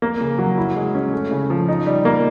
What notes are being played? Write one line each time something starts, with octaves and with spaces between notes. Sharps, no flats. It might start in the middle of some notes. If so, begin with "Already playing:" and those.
A#3
C#3
F#3
E4
G#3
C#4
A3
C#3
F3
D#4
G3
A#3